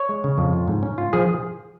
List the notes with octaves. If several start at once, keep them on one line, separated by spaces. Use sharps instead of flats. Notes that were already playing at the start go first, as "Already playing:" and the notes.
Already playing: C#5
G#3
C#3
F2
F4
G#2
C#4
F4
F3 G#4